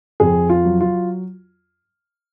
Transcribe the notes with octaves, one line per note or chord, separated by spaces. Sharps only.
F2 G#4
F4
F#3
F4